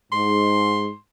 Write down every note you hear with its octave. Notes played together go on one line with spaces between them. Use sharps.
G#2 C6